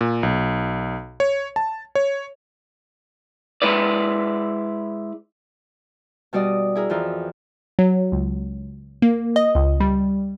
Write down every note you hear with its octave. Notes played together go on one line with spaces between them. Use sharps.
A#2
B1
C#5
A5
C#5
G#3 E4 B4 D5
B2 G3 F#4 D5 D#5 D#6
E4 G#4 A#4
F2 E3 F4 A#4
F#3
C#2
A#3
D#5
C#2
G3